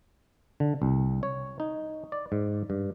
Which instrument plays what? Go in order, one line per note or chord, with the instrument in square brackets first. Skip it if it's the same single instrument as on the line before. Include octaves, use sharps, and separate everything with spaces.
[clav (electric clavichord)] D3
C2
C#5
D#4
D5
G#2
G2